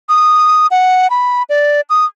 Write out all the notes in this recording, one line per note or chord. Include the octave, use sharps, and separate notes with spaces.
D#6
F#5
B5
D5
D#6